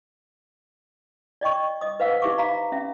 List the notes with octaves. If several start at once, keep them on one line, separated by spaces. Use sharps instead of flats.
D5 D#5 G5 C#6
D#5 D#6
B4 C5 F5 F#5 E6
D#4 G4 E5 C#6 D6
F5 A#5 B5
C#4 E5